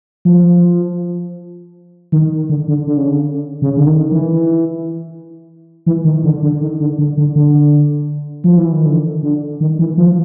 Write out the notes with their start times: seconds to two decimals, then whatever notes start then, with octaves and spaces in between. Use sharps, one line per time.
0.25 F3
2.12 D#3
2.49 D3
2.68 D3
2.87 D3
2.97 C#3
3.08 D3
3.62 C#3
3.77 D3
3.87 D#3
4.12 E3
5.86 E3
6.05 D#3
6.24 D3
6.43 D3
6.61 D#3
6.80 D3
6.98 D3
7.17 D3
7.36 D3
8.44 F3
8.57 E3
8.72 D#3
8.86 D3
9.23 D3
9.60 D#3
9.79 E3
9.97 F3